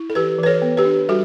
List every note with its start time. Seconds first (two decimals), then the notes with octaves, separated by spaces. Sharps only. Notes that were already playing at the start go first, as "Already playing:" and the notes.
Already playing: E4
0.10 A4
0.15 E3 G4 B4
0.38 E3 B4
0.46 A4 C#5
0.62 B3
0.77 G4 B4
0.85 D4
1.09 G3 F#4 A4